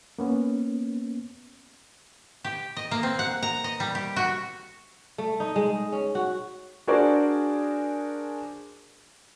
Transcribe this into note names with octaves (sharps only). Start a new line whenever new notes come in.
A#3 B3 C#4
G4
D#5
A#3
C4
F#5
A#5
D#5
G3
G4
F#4
A3
D#4
G#3
C#4
F#4
D4 F#4 G#4 A#4 C5 D5